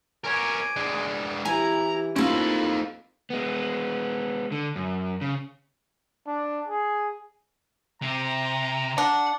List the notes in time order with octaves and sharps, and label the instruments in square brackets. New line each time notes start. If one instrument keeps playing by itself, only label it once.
[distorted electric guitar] A#4 C#5 [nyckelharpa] G#5 D6
[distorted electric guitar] G#3 D4
[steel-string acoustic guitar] E3 [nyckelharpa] E4 G4 [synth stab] G#5 [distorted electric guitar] A#5
[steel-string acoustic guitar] A#3 D#4 [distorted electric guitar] C4 A4 [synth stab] C#4 [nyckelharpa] F4 B5
[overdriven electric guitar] G#3 B3
D3
F#2
C#3
[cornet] D4
G#4
[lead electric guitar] C3 [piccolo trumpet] A#5
[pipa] D4 [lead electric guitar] F#5